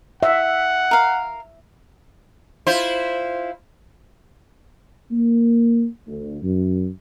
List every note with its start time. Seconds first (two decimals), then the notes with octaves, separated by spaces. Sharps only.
0.23 E5 F#5
0.91 A#4 F5
2.67 E4 F4 C5
5.11 A#3
6.07 D2
6.43 F#2